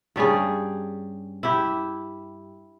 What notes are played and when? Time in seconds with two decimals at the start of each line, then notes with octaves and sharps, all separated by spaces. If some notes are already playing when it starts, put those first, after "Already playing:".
0.16 G2 G3 C#4 G#4
1.43 E4 G4